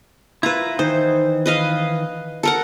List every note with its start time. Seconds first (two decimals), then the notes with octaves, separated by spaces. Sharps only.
0.43 E4 F4 B4 E5 A#5
0.79 D#3 E3 D#4 C5
1.46 B4 D#5 F5
2.43 A4 A#4 F#5